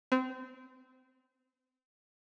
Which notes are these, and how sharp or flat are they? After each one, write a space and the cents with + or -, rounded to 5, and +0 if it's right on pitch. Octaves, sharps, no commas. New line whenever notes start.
C4 -25